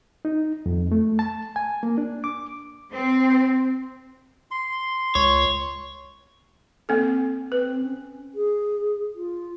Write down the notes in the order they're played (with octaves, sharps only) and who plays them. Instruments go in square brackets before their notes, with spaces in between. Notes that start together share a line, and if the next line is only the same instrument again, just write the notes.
[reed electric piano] D#4
F2
A3
A5
G#5
A#3
D4
D6
[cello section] C4
[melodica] C6
[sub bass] C#2 [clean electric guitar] C#5
[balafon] A#3 C4 A4
[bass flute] C4 [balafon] B4
[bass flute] C#4
G#4
F4